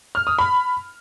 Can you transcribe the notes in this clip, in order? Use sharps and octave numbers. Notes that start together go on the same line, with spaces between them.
F6
D#6
B5